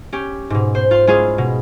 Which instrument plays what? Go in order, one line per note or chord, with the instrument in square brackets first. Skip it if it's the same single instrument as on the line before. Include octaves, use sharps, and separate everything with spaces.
[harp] C#4 G4
G#2 B2
C5
F4 C6
G#3 C#4 E4 F4 G#4
B2